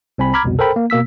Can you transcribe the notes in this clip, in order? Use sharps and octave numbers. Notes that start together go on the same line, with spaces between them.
C2 C4 G#5 B5
A#5 B5 D6 F6 G#6
C2 F2 B2
A4 A#4 C5 G5 B5
A#3
B2 A#3 E6 B6